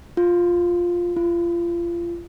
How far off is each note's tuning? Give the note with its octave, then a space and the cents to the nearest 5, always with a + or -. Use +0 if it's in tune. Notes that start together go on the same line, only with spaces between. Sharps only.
F4 +5
F4 -30